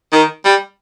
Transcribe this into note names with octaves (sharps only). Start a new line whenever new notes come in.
D#3
G3